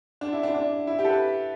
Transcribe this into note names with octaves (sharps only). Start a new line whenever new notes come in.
D4
E4
D4
D4
E4
G4
A4
B4